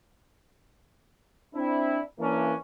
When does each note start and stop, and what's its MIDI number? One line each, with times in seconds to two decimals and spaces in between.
1.55 2.01 60
1.55 2.01 62
1.55 2.01 64
2.20 2.54 52
2.20 2.54 58
2.20 2.54 61
2.20 2.54 62